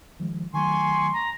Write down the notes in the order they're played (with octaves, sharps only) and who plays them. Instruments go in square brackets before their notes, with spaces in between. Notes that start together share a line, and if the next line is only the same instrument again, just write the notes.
[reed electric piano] D#3 F3 G#3
[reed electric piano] D#3 F#3 A3 [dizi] G#5 [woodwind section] C6 [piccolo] C#6
[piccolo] A#5